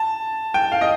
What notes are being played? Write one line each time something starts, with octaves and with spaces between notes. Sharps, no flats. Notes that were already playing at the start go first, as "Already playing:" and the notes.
Already playing: A5
G5
F5
D#5